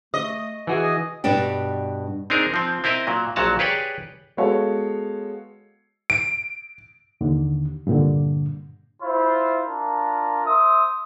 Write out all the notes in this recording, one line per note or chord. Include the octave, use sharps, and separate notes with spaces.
A3 D#5
E3 F#4 G#4 G#5
D#5
G2 B2 D4 G4
C4 D4 D#4 G#4 A#4
F3 C4
C4 E4 A#4 D#5
A#2 F#3
A#1 A#2 F#3 F#4 A5 A#5
G4 G#4 B4 C#5 D5 G5
G#3 B3 F#4 A4 C#5 F5
D7
D#2 D3
G2 A#2 D3
E4 F4 C5
D4 F4 A#4
C5 E5 D#6